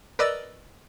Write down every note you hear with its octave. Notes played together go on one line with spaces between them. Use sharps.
A#4 B4 D5 D#5 E6 A6